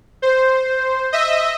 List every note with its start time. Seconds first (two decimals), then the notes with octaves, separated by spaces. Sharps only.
0.22 C5
1.13 D#5 E5